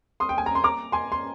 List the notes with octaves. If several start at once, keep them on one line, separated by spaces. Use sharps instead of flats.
C6 D#6
G5
G#5
A#5
C6
A#5 D6
G#5 C6
C6